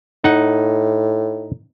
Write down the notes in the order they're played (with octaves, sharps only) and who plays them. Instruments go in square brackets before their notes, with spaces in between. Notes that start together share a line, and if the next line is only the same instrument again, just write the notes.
[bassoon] A2 [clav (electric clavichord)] D#4 F#5